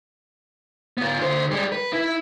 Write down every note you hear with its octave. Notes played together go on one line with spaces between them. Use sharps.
B3 F4
D3 C5
G3 G#3
B4
E4